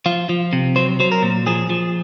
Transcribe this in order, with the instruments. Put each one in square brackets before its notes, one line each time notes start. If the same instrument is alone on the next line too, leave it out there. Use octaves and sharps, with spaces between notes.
[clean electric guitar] F3 F4
F3
C3
F#3 C5
F#3 C5
A#4
A#2
F3 G#4
F3